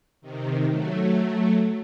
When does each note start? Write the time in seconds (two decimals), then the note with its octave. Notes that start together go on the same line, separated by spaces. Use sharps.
0.21 C3 D#3
0.68 F#3 A3